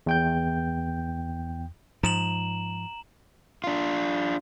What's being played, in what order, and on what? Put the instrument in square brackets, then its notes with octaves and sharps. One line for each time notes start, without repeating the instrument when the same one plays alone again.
[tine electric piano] E2 G5 G6
[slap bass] G#2 F3 [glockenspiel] A#5 E7 F#7
[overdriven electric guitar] D4 F4